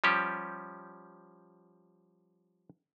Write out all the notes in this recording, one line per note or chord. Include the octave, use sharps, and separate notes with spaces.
F3 G3 C#4 G4